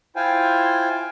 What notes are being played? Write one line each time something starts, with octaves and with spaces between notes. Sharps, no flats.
E4 F4 C5 F5 G5 G#5